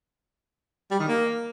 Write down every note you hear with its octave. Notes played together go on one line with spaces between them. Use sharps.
G3
D#3
A#3